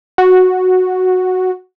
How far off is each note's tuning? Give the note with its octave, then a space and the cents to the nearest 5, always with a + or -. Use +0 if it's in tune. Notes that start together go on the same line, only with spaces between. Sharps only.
F#4 -5